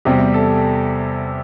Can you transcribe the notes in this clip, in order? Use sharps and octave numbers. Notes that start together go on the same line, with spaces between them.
E2 C3 G3 G4
A4